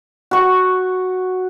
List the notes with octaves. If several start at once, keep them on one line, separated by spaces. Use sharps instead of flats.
F#4 C#6